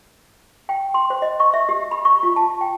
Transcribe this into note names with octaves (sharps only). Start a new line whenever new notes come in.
G5
C6
C5
D#5
C#6
E5
G4
B5
C#6
F4
A5
G5